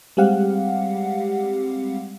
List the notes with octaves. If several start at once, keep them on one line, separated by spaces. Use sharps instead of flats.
G3 G#3 C4 G4 F5 F#5